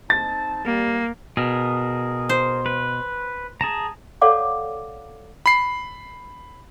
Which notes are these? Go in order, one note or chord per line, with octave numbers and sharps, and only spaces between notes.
C4 D#4 A5 A6
C2 G3 A#3
B2 G#4 A#4
C5
B4
G#4 A5 A#5
A4 C#5 D5 F5 F#5 D6
B5 C7